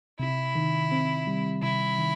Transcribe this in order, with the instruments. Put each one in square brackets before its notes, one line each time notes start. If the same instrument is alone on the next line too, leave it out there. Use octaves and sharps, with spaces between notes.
[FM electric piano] C3 [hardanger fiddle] E4
[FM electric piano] D#3
C4
G3
[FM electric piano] C3 [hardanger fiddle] E4
[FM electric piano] D#3